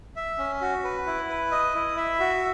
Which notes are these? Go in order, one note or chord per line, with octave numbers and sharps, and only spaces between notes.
E5
C#4
F#4
B4
E4
B4
D#5
E4
E5
F#4